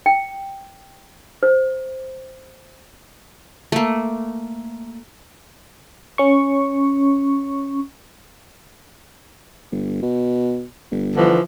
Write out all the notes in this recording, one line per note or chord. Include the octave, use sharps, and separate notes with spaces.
G5
C5
A3 A#3
C#4 C#6
G1
B2
G1
D3 E3 F3